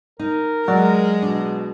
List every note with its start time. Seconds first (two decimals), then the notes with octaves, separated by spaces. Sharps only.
0.19 D#4 A#4
0.68 F#3 G#3 D5
1.22 B2 D4